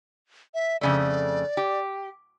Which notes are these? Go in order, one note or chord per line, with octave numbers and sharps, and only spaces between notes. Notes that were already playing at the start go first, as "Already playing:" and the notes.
E5
F2 C#3 A3 D5
G4